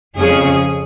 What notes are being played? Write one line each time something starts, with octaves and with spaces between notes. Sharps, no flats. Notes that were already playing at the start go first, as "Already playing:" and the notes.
F2 C#3 F3 C#4 G#4